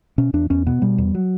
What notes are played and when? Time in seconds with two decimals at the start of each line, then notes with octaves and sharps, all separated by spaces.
0.18 B2 C#4
0.33 E2 D4
0.50 E2 C#4
0.67 B2 B3
0.82 B2 G3
0.98 E2
1.15 F#3